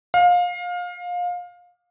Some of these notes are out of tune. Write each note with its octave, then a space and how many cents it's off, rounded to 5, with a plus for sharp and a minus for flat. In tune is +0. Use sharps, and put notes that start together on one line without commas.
F5 +25